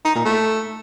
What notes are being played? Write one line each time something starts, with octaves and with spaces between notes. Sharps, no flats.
D#4
A#2
A3